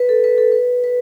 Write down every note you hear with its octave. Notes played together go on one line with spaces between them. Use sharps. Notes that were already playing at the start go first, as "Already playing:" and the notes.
Already playing: B4
A4
B4
A4
B4
B4